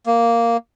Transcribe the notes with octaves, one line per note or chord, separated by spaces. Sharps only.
A#3